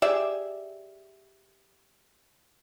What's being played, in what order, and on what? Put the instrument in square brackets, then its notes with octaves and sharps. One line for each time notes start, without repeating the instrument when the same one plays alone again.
[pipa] G4 G#4 D5 E5